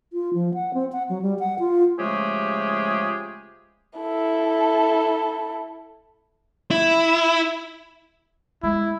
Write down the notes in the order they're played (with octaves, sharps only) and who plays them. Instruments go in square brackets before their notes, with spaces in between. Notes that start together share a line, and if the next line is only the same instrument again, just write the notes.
[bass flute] F4
F3
F#5
C4
F#5
F#3
G3
F#5
F4
[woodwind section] C#3 F3 G#3 A3 G4 G#4
[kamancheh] E4 A4
[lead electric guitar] E4
[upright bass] G#3 [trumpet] E4